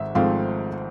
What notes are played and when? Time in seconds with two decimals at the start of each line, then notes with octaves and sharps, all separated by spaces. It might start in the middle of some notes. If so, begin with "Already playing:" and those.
Already playing: G#1 G#2 E5
0.15 G#1 G#2 F3 A3 C4 F5